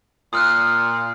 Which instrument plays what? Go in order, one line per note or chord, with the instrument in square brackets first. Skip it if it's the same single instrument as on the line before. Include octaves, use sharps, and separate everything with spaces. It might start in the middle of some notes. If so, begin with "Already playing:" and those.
[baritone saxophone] A#2 [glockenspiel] D#6 F6 F#6